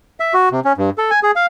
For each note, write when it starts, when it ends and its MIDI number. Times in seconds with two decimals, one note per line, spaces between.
0.20 0.34 76
0.34 0.49 66
0.52 0.60 48
0.65 0.73 61
0.78 0.90 43
0.98 1.11 69
1.11 1.20 80
1.23 1.31 68
1.36 1.46 77